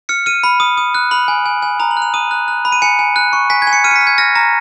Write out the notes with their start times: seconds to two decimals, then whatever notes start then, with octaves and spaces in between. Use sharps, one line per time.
0.09 F6 C#7
0.26 F6 D#7
0.44 B5
0.60 D#6
0.78 D#6
0.95 F#6
1.11 B5 F#7
1.28 G#5
1.46 G#5
1.62 G#5
1.80 A#5 F7
1.91 F#7
1.97 F#6
2.02 F7
2.14 D#6 D#7
2.31 F#6
2.48 F#6
2.65 B5
2.72 D#7
2.82 G#5 C#7
2.99 G#5
3.16 F#6
3.33 C#6
3.50 G#5 B6
3.62 G#6
3.67 G#5
3.73 C#7
3.84 F6 D#7
3.91 C#7
3.96 B6
4.01 F6
4.07 G#6
4.18 F6 A#6
4.35 A#5 A#6